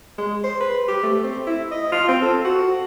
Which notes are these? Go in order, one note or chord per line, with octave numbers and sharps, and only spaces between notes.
G#3
C5
B4
G4
A3
C4
E4
D#5
F4
C4
A4
F#4